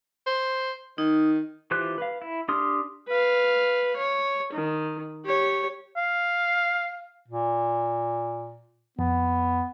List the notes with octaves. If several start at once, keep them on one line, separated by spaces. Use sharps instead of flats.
C5
D#3 D#4
E3 F4 G4 C5 F#6
B4 F5
E4
D4 G4 C6 D#6 F6
B4 F5
C#5
D#3
G4 C#5
F5
A#2
F2 B3